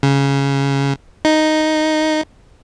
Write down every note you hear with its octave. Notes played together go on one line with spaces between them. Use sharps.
C#3
D#4